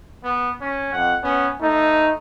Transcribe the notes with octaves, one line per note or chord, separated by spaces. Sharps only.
B3
C#4
F2 F#5
B3 C#4
A3 D#4